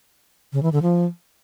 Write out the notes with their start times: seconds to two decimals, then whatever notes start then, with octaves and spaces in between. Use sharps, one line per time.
0.53 C#3
0.63 E3
0.73 D3
0.82 F3